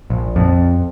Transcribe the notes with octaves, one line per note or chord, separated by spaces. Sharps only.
A#1
F2